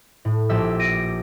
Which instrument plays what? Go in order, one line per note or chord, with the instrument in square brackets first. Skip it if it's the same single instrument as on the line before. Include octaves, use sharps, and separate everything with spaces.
[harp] A2
A#1 G4 E5 E6
A#6 D7 D#7